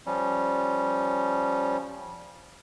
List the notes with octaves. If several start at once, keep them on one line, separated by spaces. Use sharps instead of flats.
F3 G3 C#4